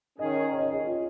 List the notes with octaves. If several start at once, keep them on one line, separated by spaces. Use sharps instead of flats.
D#3 C#4 G#4 D#5
C#5
D#5
G#4
F4